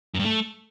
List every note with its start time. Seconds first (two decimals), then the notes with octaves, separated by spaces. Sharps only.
0.14 F#2
0.19 G2
0.24 A3